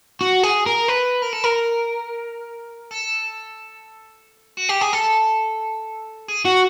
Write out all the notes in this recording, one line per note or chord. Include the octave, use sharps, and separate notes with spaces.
F#4
G#4
A#4
B4
A#4
A4
A#4
A4
F#4
G4
G#4
A4
G#4
F#4